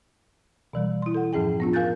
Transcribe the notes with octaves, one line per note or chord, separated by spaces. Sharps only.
B2 E3 G3
E4 C6
A4 F#5
F#2 A2 F3 C#4 G#4 G5
B3 D4 F4
A#4 F5 G#5 F#6 G6 A6